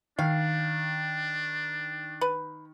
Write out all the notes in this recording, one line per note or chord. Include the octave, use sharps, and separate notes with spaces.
D#3 D4 F5
B4